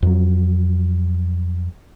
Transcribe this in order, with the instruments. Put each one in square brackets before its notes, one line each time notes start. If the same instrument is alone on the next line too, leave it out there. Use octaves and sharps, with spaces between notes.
[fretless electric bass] F2 F#3